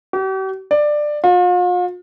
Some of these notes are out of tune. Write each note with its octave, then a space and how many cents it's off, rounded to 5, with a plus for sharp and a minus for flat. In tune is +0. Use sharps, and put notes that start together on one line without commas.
G4 -45
D5 +15
F4 +40